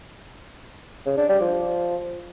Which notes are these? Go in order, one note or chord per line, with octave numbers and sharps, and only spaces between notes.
C#3
D4
G3
F3